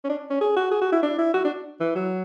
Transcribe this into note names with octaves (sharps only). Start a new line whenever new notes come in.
C#4
D4
C#4
G#4
F#4
G#4
F#4
E4
D4
E4
F#4
D4
E3
F#3